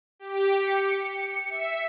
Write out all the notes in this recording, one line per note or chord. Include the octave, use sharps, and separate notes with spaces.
G4
C#7
C#7
E5